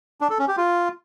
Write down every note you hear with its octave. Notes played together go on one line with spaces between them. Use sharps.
D4
A4
C#4
G4
F4